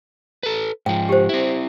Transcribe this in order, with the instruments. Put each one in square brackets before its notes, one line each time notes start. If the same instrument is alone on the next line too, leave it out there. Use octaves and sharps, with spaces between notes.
[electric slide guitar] A4 B4
[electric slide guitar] G#2 F3 [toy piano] G5
[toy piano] G4 C5
[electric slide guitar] C4 E4